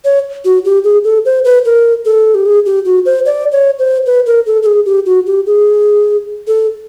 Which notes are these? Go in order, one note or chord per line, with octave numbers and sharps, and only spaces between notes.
C#5
F#4
G4
G#4
A4
C5
B4
A#4
A4
G4
G#4
G4
F#4
C5
D5
C#5
C5
B4
A#4
A4
A4
G#4
G4
F#4
G4
G#4
A4